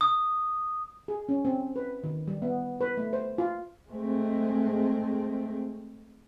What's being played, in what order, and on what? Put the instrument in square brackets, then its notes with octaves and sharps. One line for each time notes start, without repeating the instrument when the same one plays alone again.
[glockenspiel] D#6
[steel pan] G#4
C#4
C4
B4
D#3
G3
B3
B4
A3
C5
F4
[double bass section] G#3 A3 C4